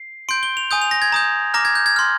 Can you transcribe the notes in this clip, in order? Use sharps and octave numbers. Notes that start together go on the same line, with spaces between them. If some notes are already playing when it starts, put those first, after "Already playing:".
Already playing: C7
C6 G6 D7
G7
F7
G#5 D#6 G6
F7
A#6
G#6
A#5 D#6 G6
A#5 D6 F6 A#6
G#6
G6
G#6
C6 F6